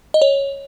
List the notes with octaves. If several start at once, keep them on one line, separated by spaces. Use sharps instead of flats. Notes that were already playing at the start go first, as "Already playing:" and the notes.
D#5
C#5